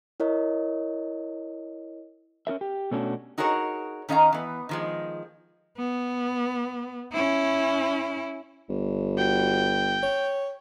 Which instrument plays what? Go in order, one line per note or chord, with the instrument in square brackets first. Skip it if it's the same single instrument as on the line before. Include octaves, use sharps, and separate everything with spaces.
[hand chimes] E4 A#4 C#5 D#5
[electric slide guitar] C#4 D#4 A#4 E5
G4
B2 A3 C#4 D4 F#4
[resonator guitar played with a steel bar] D#4 F#4 G#4 A#4 C#5
D#3 C#4 D#5 F5 A#5
E3 B3
D#3 F3 G#3
[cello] B3
C#4 E4
[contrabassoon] G1
[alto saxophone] F#4 [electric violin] G5
[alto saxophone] C#5